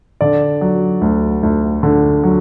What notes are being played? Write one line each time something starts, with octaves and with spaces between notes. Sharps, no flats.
D3 D5
F#3
D2
D2
D3
F#3